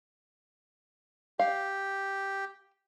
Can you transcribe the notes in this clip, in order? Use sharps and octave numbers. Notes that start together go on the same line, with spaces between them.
G4 F5